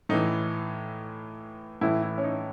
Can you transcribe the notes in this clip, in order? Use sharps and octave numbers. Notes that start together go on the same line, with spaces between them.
A2 E3 D#4
A2 E3 E4
E4
C#4
D#4